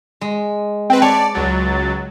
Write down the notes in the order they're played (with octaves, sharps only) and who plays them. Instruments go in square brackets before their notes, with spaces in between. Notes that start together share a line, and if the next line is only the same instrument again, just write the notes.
[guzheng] G#3
[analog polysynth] C4 B4 [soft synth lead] G5
[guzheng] C#5 [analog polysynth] D5 [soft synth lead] A5
[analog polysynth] C#2 F#3 [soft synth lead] A6